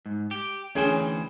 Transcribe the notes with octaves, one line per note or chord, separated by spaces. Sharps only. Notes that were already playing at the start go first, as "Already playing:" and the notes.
G#2
G4
D2 E3 C#4 G#4 C5 G5